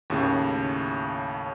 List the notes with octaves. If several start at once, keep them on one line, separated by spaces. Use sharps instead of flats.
D#2 A2 C#3